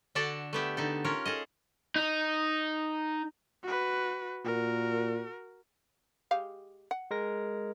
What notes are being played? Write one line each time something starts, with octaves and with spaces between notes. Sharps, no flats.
D3 D4 F#4 A4 D5 A5
A3 B3 G4 E5
D3 D#4 A4
C#4 F4 A#4 C#5
G#4 A4 D#5
D#4
F#4 B4
A#2 F#4 A#4
G#3 G4 F5
F#5
G#3 A#4 A#6